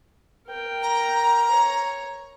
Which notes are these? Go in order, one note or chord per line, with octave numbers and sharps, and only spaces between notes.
A#4 G5
A#5
C#5